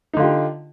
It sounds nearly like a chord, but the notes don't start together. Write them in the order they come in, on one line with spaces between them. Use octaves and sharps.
D#4 D3 F4 G4